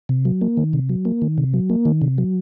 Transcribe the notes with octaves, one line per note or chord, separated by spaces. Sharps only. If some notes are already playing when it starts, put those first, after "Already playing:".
C3
F#3
A#3
D#3
C3
F#3
A#3
D#3
C3
F#3
A#3
D#3
C3
F#3